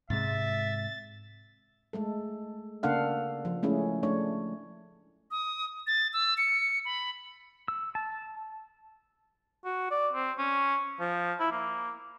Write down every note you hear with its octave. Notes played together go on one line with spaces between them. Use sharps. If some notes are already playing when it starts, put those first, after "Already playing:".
G#2 C3 G#3 E5 A6
G#3 A3 A4
C#3 A#3 D4 A4 F5 F#5
F3
G#3 A3 C#4 E4 G#4
A3 D4 C#5
D#6
A6
E6
C#7
B5
E6
A5
F#4
D5
C4
C#4
F3
E4
A#3